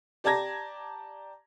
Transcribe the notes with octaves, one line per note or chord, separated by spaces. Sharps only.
G4 D5 A5 A#5 G#6 A#6